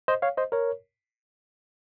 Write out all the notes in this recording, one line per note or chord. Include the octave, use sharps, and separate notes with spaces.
C5 D#5
C#5 F5
C5 D#5
A#4 C#5